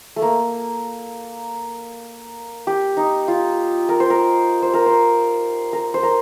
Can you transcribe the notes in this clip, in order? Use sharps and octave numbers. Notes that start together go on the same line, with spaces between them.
A3
A#3
G4
D#4
F4
A#4
C5
A#4
C5
A#4
C5
A#4
C5
A#4